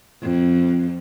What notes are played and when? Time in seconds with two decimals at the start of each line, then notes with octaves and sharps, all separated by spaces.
0.22 F2